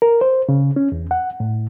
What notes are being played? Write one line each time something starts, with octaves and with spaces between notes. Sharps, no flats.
A#4
C5
C#3
C#4
E2
F#5
A2